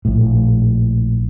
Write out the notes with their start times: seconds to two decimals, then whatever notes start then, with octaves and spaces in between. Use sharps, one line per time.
0.05 A#1 A2